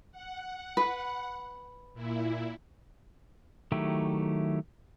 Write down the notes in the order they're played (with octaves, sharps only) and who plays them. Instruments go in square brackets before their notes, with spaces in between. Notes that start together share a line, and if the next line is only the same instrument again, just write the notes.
[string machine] F#5
[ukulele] B4
[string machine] A#2 E4
[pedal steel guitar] D#3 F#3 A3 E4 G4